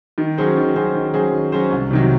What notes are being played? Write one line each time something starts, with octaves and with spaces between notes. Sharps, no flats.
D#3
F#3 C#4 G#4 C5
D#3
F#3 C#4 G#4 C5
D#3
F#3 C#4 G#4 C5
D#3
F#3 C#4 G#4 C5
C2
C3 D#3 F#3